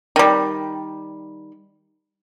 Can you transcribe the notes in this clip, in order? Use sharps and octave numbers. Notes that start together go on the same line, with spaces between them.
D#3 G3